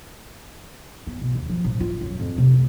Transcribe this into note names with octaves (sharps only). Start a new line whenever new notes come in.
B3
B2
D#2
F3
A#1
F4
F#2
F2
C3
D2